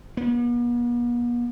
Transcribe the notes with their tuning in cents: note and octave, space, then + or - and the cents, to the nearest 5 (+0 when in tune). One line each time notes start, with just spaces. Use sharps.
B3 -45